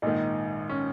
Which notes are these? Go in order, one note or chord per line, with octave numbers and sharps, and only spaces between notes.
A#1 G#2 D#3 D#4
C#4